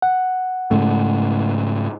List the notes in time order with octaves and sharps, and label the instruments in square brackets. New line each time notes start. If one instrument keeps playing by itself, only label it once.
[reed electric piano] F#5
[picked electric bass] G#2 C#3 A3